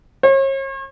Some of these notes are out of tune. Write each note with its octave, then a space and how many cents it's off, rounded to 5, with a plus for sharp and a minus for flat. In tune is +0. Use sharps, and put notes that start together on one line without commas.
C#5 -40